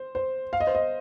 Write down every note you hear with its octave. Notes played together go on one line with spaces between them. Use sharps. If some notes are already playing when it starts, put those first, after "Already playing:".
Already playing: C5
C5
F5
D#5
C5
D#5